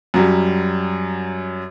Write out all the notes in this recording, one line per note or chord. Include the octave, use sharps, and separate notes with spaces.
F#2 F#3 G3